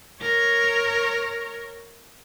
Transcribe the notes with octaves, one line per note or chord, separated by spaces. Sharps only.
A#4 C#5